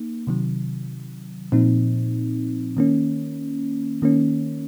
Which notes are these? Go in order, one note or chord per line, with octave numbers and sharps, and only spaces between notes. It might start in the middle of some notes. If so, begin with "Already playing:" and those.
Already playing: A#3 D#4
C3 D#3 F#3
A#2 F3 C4 D#4
D#3 A#3 C#4
D#3 A#3 C#4